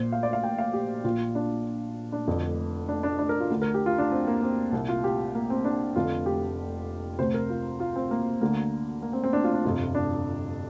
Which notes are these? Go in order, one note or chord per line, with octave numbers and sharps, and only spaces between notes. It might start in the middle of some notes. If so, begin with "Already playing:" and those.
Already playing: A#1 A#2 C5
F5
D5
F5
G5
F5
G4
A#1 A#2 F4
D4
D4
F1 F2 D3
D4
D4
D4
A#4
F4
D2 D3
A#4
G4
F4
D4
C4
A#3
C4
C2 A#2
F4
G4
A#3
C4
D4
F1 F2 D3 F4
G4
D2 C3 C5
A#4
F4
F4
C4
A#3
D2 D3 A#3
A#3
C4
C4
D4
F4
D4
G1 F2 C3 F4
D4